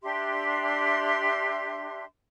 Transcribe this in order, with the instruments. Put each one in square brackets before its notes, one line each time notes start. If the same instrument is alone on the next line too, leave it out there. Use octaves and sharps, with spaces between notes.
[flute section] D4 G4 E5 C6